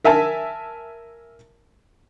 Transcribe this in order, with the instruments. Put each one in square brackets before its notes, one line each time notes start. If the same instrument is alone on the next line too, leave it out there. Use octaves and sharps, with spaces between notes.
[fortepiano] A#4 E5 G#5 A5